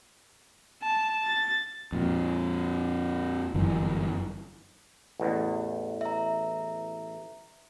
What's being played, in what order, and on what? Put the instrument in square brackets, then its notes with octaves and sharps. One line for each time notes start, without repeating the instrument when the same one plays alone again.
[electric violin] A5
A6
[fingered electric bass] F2 A#2
G1 F#2 E3
[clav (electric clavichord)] A1 E2
[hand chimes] E5 A#5